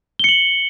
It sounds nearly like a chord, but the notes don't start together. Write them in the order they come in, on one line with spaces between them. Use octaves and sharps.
G7 C#7 F#7